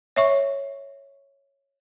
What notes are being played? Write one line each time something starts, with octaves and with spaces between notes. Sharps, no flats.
C#5 E5 C#6